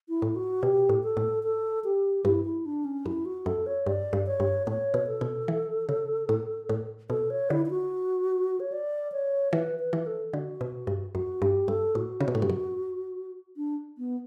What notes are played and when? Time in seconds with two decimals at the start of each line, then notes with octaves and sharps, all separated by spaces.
0.09 E4
0.22 A2
0.36 F#4
0.62 B2 G4
0.89 A2
1.03 A4
1.17 A2
1.43 A4
1.84 G4
2.25 G2 E4
2.45 E4
2.66 D4
2.85 C#4
3.06 F#2 E4
3.25 F#4
3.46 F#2 A4
3.66 C#5
3.86 G2 D5
4.13 G2
4.26 C#5
4.40 G2
4.67 A2 C#5
4.94 B2
5.07 A4
5.21 B2
5.48 E3
5.89 C#3
6.29 A2
6.69 A2
7.10 B2 A4
7.30 C#5
7.50 D3 E4
7.66 E4
7.70 F#4
8.60 C#5
8.72 D5
9.12 C#5
9.52 E3 B4
9.79 B4
9.93 E3
10.06 A4
10.33 D3 F#4
10.61 B2
10.87 G2
11.15 F#2 F#4
11.42 G2 G4
11.68 G2 A4
11.95 A2 F#4
12.20 C#3
12.28 B2
12.35 A2
12.42 G2
12.50 F#2
13.57 D4
13.98 B3